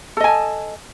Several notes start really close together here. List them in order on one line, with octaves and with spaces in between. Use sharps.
A4 D#5 G#5 A5